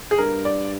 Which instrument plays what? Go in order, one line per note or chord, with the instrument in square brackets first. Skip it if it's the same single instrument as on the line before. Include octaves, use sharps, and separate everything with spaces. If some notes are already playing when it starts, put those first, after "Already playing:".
[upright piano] G#4
[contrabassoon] G2 [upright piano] A#4
[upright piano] D5